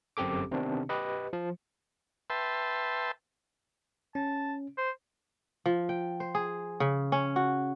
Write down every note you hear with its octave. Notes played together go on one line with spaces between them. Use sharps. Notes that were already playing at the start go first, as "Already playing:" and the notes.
G1 F#2 C4 G4 A4 D6
C3 D#3 B3 C4 D4
G4 B4 D#5
F3
B4 E5 G5 A5 C6
C#4 A5
C5
F3
G5
C5
G#4
C#3
C#4
F#4